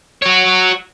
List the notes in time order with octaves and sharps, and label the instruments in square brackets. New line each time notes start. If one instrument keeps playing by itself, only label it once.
[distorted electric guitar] F#4 C#5